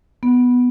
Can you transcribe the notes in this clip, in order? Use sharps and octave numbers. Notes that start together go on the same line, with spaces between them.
B3